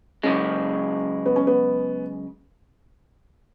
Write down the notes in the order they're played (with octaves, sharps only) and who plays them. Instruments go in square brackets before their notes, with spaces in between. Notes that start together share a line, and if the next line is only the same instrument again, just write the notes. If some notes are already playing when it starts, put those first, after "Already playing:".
[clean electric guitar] F#2 C#3 G#3 [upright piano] C#4
[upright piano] B3
C#4
B3